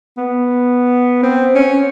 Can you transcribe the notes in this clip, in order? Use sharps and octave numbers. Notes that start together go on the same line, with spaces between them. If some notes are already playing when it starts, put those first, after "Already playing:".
B3
C4
C#4